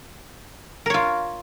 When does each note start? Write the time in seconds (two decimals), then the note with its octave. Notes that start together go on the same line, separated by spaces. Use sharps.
0.86 A#4
0.90 C#5
0.94 F4